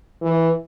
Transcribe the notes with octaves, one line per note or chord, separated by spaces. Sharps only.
E3